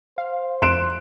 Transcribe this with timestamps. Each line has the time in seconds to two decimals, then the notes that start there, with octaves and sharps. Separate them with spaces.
0.18 C5 F5
0.62 F2 C6 F#6 D7 E7